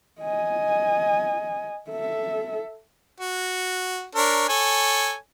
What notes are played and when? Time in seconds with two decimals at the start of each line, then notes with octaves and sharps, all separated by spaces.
0.21 D#5 G#5
1.90 A4 E5
3.20 F#4
4.15 D4 A#4 C#5
4.49 A4 C#5 G#5